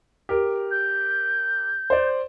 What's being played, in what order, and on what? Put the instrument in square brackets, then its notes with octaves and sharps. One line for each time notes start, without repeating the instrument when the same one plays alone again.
[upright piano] G4 A#4
[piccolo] G6
[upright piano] C5 D5